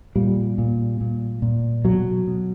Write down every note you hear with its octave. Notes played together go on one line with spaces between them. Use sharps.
A#2 G3
A#2
A#2
A#2
B2 F#3
B2